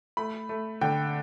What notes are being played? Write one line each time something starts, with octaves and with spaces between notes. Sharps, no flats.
A3 B5
A3
D3 G5